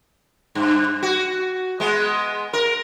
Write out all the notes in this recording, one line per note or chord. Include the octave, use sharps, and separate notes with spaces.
G2
F#4
G#3 B3
A#4